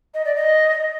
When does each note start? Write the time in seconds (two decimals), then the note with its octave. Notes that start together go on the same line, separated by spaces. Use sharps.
0.14 D#5
0.25 D5
0.36 D#5